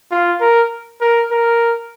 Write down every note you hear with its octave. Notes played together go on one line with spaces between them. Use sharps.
F4
A#4
A#4
A#4